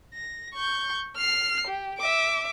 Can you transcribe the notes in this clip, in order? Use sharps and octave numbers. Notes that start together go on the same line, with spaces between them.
A#6
C#6 G6
F6 C7
G4
E5 D6